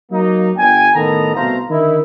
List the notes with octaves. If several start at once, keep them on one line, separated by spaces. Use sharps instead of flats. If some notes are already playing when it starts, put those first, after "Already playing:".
F#3 A#3 D#4
G1 G5 G#5
A2 D#3 B3 A4 D#5 A#5
C2 B2 A3 C5 F5 A#5
D3 D#3 D#4 E4